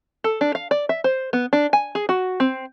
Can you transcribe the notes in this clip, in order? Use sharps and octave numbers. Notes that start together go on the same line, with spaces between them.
A4
D4
F5
D5
E5
C5
B3
D4
G#5
G#4
F#4
C4